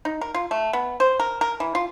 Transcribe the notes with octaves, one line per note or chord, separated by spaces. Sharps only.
D#4
A#4
F4
A3
B3
C5
A#4
A#4
E3
F4